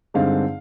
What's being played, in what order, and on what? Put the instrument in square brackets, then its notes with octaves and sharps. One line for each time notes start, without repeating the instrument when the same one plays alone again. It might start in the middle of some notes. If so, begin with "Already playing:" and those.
[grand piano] G2 D3 G#3 C4 D#4 F5